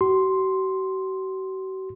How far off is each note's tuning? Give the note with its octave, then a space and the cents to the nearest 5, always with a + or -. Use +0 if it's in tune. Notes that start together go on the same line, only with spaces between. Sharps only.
F#4 +45 C6 +0